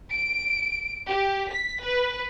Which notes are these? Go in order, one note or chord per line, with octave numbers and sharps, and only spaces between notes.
D7
G4
B6
B4